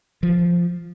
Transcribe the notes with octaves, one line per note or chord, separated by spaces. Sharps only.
F3